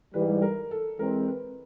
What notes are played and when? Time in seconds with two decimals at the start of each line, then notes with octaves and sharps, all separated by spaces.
0.14 G#2 E3 G3 B4
0.42 A#4
0.71 A4
0.99 E3 G#3 C4 A#4
1.28 B4